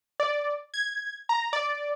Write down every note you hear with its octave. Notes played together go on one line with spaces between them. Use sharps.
D5
G#6
A#5
D5